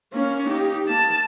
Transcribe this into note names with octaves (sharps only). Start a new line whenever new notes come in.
A#3 C#4
D#4 G4
A#3 A5